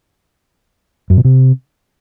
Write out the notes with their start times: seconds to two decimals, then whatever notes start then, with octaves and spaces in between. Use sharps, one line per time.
1.10 F#2
1.17 B2
1.25 C3